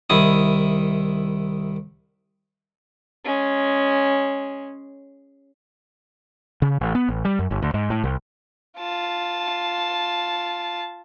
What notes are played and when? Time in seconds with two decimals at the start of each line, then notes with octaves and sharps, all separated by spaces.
0.10 C2 D#3 E4 D#6
3.25 G#3 C#4
6.62 C#3
6.81 A1
6.95 B3
7.09 A1
7.25 G3
7.39 F#2
7.51 G1
7.62 D2
7.74 G#2
7.90 A2
8.04 C2
8.79 F4 A5